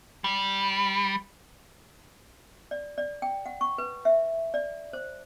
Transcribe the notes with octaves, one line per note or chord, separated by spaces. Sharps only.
G3
D5
D5
G5
F#5
C#6
B4
E5
D5
C5